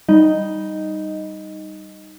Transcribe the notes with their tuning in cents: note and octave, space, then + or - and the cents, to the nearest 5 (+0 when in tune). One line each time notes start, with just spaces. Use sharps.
G3 +0 D#4 +0 D#5 +0